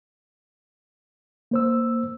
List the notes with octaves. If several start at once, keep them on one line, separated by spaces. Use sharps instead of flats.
A#3 C5 E6